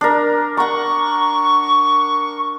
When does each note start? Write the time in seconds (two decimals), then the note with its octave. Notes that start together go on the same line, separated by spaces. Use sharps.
0.01 D4 A#4
0.57 F#5 A#5 C#6